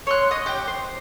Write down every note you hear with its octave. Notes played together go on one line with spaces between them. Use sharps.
C#5 C6 F#6
D#5
G4 G5
C5